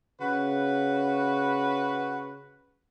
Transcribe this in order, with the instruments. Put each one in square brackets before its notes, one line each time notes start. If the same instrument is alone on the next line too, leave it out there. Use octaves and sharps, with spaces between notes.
[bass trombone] C#3 [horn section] F#4 B4